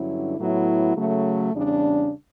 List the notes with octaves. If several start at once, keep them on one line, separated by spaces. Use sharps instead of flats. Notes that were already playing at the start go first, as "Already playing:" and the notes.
Already playing: G2 D3 F#3 C#4 E4
A2 F#3 B3 E4
C#3 F#3 A3
E2 C#3 G3 D4